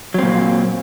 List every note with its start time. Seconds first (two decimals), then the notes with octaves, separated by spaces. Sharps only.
0.14 F#3
0.18 C4
0.23 A#2